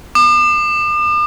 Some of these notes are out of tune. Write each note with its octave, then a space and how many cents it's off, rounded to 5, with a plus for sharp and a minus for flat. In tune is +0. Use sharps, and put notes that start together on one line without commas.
D6 +45